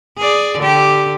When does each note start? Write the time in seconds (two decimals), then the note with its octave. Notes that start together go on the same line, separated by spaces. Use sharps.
0.17 G#4 D5
0.58 D3 G4